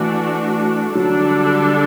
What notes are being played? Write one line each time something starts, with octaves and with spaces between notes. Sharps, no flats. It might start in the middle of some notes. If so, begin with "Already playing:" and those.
Already playing: E3 A3 D4 F#4
D3 F#3 G3 D4 A4